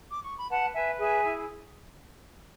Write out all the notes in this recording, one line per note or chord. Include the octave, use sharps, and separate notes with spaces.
D6
C#6
B5
B4 F#5 A5
B4 E5 G#5
G#4 E5 G#5
E4